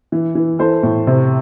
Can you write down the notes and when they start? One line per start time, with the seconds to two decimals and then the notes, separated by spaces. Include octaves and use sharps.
0.12 E3
0.35 E3
0.59 E3 A4 C5
0.83 A2
1.07 C3